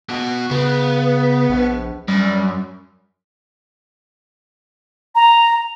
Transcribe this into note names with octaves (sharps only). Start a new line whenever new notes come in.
B2 F#4
C#3 B3
A#1
F#2 G3
A#5